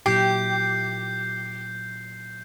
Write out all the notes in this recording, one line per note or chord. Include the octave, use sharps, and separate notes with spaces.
A#2 F#3 E4 G4 G5 G6 C7